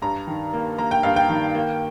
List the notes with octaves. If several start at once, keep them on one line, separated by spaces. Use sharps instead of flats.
G2 A#5
D#3
A#3
A#3 A#5
G5
G2 F5
G5
D#3
A#3